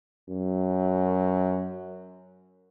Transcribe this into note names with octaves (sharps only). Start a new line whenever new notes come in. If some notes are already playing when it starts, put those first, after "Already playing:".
F#2